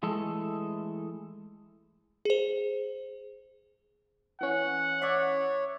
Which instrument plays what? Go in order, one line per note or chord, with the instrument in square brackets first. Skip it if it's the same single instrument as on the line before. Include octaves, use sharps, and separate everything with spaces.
[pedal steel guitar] E3 G#3 A3 A4
[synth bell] G#4 C5
[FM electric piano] E3 C#4 [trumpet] F#5
[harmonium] C#5 [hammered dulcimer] D5 E5